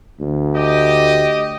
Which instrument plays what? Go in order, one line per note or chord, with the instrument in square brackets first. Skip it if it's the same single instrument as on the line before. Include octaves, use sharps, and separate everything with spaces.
[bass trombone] D2
[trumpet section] G4 D#5